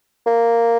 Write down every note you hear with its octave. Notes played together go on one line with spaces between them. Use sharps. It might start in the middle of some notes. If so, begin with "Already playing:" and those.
A#3